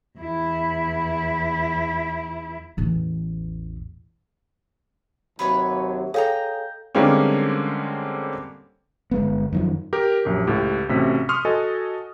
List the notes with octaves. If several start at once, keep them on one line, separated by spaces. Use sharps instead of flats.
E2 E4
A1 E2
D#2 C3 F#3 B4 C#5 F#6
G#4 A4 C#5 D#5 F5 G5 A#5
D3 G3 G#3 A#3 C4 C#4
G1 G#3 B3
F#2 D#3 F3
G4 A#4
A#1 F#2 F#3 G4
C#2 A2 G4
A1 C3 A3 C#4 F#4 B6
C6 C#6 D#6 F6
F#4 A4 D#5 G#5